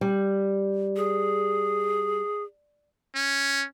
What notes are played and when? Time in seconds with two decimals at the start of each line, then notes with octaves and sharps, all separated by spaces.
0.01 G3
0.96 G#4
3.16 C#4